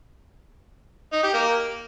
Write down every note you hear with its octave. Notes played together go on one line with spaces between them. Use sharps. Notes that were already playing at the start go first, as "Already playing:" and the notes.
D#4
G4
A#3